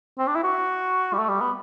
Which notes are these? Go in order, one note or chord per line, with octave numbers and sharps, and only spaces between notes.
C4
D4
E4
F#4
G3
A3
G3
B3